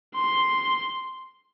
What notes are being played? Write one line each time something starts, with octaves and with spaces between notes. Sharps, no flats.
C6